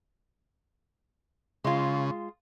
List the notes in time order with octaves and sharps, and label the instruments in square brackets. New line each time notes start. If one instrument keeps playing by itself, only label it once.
[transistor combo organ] C#3 [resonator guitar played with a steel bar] G#3 F4